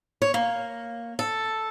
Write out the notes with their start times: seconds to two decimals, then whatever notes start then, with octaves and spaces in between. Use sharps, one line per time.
0.22 C#5
0.34 A#3
1.19 A4